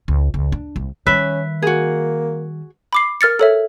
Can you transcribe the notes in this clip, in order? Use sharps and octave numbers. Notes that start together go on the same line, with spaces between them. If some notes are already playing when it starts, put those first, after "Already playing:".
C#2
C#2
D4
C2
D#3 G3 C#4 B4 E5
A#3 F#4 G#4
B5 D6 C7
A#4 F6 A6 C#7
A4 C#5 E5